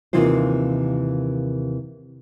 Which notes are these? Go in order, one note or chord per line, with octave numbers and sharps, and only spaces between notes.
D#2 C3 E3 D#4 F4 C5